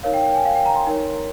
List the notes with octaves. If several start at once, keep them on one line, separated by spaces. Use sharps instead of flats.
D#4 A#4 C#5 F5
G5
G5
G#5
F5
G5
A#5
C6
D#4 A#4 C#5